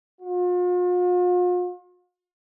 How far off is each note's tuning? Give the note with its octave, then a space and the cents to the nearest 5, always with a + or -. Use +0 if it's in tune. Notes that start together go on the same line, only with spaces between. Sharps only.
F4 +40